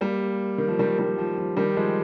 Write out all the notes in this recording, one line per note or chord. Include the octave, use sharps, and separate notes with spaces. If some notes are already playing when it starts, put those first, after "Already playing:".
G3 A#3
D#3
F3
D#3 G3
D#3 G3
F3
F3
D#3 G3
F3 G#3